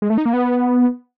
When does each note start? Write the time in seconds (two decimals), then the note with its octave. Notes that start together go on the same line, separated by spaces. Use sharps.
0.02 G#3
0.10 A3
0.18 D#4
0.26 A#3
0.33 B3